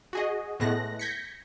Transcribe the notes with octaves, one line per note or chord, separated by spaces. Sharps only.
F#4 G#4 D#5
A2 G#3 A3 B3 F#6 A#6
G6 G#6 A#6 B6 C#7